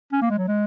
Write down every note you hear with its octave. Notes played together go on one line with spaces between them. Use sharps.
C#4
A#3
G#3
F#3
G#3